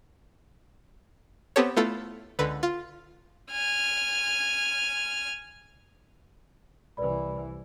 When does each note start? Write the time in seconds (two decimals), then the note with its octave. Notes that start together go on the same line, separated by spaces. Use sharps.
1.56 B3 C4 G4 A4 C#5
1.76 A3 B3 E4 F4 A4
2.39 C#2 D3 B4
2.63 F4
3.52 G#5 F6
6.97 C2 E3 B4 D5 B5